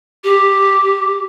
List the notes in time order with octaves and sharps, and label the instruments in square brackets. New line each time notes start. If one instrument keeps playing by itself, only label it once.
[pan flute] G4